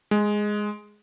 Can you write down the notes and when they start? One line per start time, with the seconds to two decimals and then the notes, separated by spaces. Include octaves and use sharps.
0.11 G#3